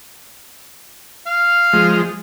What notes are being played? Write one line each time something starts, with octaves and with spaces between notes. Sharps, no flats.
F5
F3 G#3